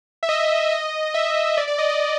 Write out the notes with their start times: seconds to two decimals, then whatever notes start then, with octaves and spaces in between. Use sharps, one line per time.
0.23 E5
0.29 D#5
0.71 D#5
1.14 E5
1.57 D5
1.68 D5
1.78 D#5
1.89 D#5